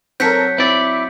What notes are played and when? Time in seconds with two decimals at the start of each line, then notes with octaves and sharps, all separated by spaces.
0.20 F#3 C4 F#4 A4 A#4 G6 B6 C#7
0.58 C4 E4 D5